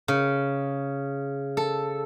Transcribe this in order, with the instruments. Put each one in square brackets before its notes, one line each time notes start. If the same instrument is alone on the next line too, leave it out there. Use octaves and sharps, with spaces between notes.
[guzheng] C#3
A4